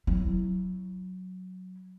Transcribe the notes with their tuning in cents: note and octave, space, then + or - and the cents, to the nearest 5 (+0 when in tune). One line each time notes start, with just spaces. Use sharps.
F#3 +0 E4 +0